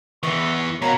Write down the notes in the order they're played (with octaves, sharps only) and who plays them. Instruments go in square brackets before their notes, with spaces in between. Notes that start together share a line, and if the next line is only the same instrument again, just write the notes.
[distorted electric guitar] E2 E3 [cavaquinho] D#5 E5 [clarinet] C#6
[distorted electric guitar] B2 [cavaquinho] A#4 F5 A#5 [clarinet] C#5